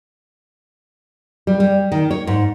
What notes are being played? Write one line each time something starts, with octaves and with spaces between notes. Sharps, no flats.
G3
G3
D#3
C#5
G#2